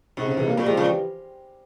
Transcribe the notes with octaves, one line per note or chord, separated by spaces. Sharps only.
G#2 C3
C#3
C3 E3
G3 A#3
A#2 G3 A#3
C3 F3 G#3
A#2 C#3 F3
E3 G3